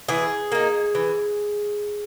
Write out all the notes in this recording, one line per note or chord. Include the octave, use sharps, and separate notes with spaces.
E3 G#4
A#3 D#4
E3